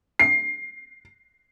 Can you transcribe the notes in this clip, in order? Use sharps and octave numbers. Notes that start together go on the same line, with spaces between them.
C7